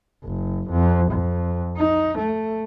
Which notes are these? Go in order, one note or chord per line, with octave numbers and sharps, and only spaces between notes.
F#1
F2
F2
D#4
A3